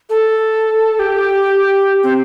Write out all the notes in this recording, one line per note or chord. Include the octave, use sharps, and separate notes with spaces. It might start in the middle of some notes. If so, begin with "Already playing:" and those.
A4
G4
C4